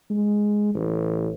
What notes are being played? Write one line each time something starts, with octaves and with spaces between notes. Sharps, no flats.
G#3
A1